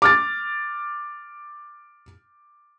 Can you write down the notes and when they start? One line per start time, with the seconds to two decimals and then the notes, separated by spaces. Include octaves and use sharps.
0.02 D6 F6 A6